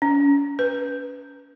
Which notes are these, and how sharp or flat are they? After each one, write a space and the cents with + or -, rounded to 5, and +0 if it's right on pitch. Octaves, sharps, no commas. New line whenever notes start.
C#4 +35
B4 +5